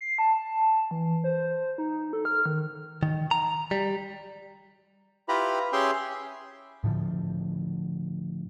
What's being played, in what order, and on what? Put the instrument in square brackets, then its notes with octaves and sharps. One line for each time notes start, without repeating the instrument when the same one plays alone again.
[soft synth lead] C7
A5
E3
C5
D#4
A4
F6
D#3
[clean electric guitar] D#3
A#5
G3
[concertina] E4 F4 G4 B4 A#5 B5
C#4 G4 G#4 E5 G5 C6
[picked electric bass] A2 D3 F3